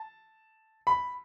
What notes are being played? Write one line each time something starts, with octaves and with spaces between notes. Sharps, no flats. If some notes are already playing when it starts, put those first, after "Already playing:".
Already playing: A5
B5